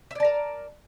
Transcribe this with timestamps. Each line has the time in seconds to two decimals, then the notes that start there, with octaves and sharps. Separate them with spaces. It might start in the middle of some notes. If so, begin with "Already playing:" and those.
0.11 E5
0.15 D5
0.20 A5
0.25 A#4